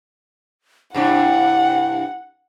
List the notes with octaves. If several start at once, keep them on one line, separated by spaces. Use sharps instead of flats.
G2 C3 D4 E4 F#5